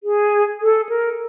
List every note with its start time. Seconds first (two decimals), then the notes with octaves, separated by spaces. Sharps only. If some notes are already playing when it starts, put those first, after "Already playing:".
0.04 G#4
0.62 A4
0.89 A#4